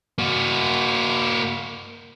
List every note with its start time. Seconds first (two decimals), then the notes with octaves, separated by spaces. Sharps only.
0.18 A#3 F#4